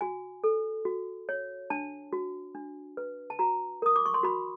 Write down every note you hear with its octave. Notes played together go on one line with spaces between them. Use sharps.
F#4 G#5
A4
F#4
C#5
D4 A5
F#4
D4
B4
A5
F#4 A#5
A#4 D#6
D6
C#6
C6
F#4 B5